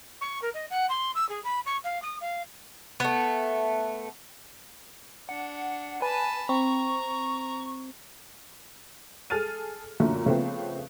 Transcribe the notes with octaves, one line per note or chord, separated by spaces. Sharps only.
C#6
A#4
D#5
F#5
C6
E6
G#4
B5
C#6
F5
D#6
F5
A3 B3
D4 F#5
B4 G#5 A5 B5
C4 A#5 C#6
G#4 A4 F6 A6 D#7
F#2 A#2 D3 A3
C#3 F3 A3 B3 C4